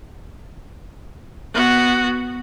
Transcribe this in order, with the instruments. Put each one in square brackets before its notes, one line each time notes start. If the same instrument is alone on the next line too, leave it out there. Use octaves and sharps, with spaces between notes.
[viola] B3 F#4